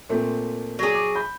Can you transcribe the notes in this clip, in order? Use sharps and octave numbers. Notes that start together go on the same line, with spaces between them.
A#2 A3 C4
F#3 G#4
D6
B5 G6